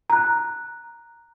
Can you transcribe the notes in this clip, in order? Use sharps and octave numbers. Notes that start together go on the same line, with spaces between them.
A#5 F#6